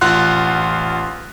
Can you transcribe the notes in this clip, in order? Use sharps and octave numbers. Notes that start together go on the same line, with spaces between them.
A1 F4 F5 F#5 C6 F#6